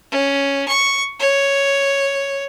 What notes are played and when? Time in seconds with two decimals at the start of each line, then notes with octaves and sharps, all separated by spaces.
0.11 C#4
0.68 C#6
1.20 C#5